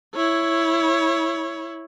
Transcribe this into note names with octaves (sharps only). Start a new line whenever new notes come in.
E4 C#5